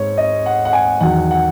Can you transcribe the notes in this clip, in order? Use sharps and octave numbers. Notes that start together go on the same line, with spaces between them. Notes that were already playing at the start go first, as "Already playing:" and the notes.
Already playing: G#2 C#5
D#5
F#5
F#5
G#5
E2 D#3 F#3 F#5
F#5